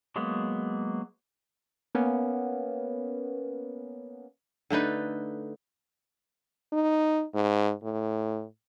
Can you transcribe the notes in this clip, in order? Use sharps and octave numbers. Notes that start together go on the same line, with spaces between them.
F#3 G#3 A#3 B3
A#3 B3 C#4
D3 A3 D#4 B4
D#4
G#2
A2